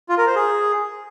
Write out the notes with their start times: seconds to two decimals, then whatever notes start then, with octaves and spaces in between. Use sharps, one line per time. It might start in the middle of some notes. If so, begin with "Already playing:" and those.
0.09 F4
0.18 A#4
0.27 C5
0.36 G#4